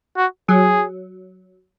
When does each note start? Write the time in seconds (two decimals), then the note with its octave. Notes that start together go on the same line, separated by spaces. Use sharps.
0.17 F#4
0.49 F#3 G#4